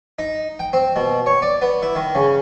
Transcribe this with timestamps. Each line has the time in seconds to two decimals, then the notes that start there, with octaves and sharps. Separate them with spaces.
0.19 D#4
0.59 G5
0.73 C4
0.96 B2
1.26 C#5
1.42 D5
1.62 B3
1.82 E4
1.95 D#3
2.15 C#3